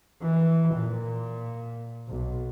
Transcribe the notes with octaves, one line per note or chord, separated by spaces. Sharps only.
E3
A#2
B1